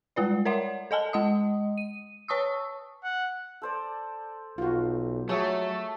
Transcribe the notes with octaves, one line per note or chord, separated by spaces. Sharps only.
G3 G#3 F4 B4 D5
A#4 C#5 D5 E5 F#5 C6
A4 D#5 G#5 A5
G#3 D#5 D#6
D#7
B4 C#5 A5 C#6 D#6 E6
F#5
A4 C5 D5
B1 F4 F#4
F#3 A3 G#4 C#5 E5 A5